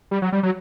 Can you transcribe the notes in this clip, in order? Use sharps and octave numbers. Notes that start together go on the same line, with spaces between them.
G3
F#3
G3
F#3